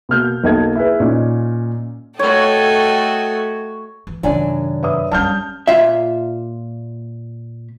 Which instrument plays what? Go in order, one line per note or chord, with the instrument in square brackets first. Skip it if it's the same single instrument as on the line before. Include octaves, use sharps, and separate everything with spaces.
[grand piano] B2 A#3 F6 G6
B1 A#3 D#5 A5 G#6
E4 G#4 B4
A#2 C#4 D#4
[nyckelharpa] A3 F#4 [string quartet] A4 D#5 G5 [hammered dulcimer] C#5
[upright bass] E3
[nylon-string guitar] F#2 D4 G#5 [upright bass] C3 D#3
[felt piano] B4 E5 D#6
[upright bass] G3 C#4 [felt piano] A5 F6 G6
[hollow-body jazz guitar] A#2 F4 E5